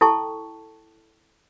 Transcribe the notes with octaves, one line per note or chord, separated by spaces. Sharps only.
E4 A4 G5 A5 C#6